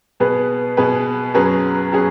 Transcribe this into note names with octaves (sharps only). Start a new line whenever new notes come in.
B2 B3 G#4 B4
B2 B3 G#4 B4
F#2 F#3 C#4 G#4 B4
F#3 C#4 G#4